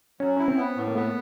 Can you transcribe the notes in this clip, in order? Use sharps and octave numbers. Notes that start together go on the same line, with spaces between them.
F#3 C#4
C#4 E4
C4
B3
A2
A#3
A3 B3